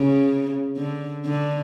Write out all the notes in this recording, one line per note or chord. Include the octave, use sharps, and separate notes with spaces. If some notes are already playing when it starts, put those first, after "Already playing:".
Already playing: C#3
D3
D3